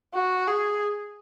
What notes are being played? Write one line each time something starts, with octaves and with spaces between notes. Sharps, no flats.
F#4
G#4